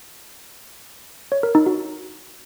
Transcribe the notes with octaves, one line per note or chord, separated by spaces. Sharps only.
C#5
A#4
D#4
F#4